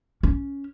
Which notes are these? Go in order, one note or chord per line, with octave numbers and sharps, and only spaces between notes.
C#4